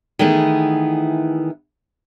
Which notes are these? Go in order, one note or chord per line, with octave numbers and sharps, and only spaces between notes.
D#3 E3 A3 B3 E4 G#4